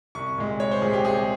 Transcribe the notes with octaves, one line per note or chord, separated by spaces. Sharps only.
C2 C#6
A#2 G#3
C2 C#5
C5
A#2 G#3 G#4
G4
C2 G#4